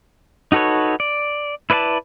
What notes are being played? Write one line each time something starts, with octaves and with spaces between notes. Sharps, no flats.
D#4 F#4 A4 B4 C#5
D5
E4 B4 D5 E5 A5